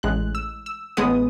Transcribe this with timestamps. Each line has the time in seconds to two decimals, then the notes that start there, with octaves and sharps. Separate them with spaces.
0.03 A1 A2 G#3 F#6
0.35 E6
0.66 E6
0.97 A1 A2 G#3 B3 D#6